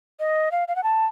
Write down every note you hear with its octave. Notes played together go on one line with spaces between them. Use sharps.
D#5
F5
F5
F#5
A5